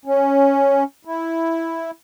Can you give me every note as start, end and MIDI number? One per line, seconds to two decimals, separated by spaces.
0.05 0.83 61
1.05 1.91 64